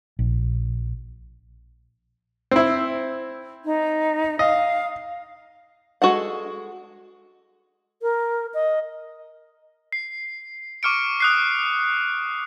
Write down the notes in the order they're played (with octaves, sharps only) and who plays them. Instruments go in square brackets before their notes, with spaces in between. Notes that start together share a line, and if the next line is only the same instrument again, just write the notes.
[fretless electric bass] A#1
[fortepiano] C4 E4
[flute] D#4
[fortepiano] D#5 [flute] F5
[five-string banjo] G#3 F#4 A4 F#5
[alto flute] A#4
D#5
[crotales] C7
C#6 D6 F6 C#7 D7
D#6 F#6 C7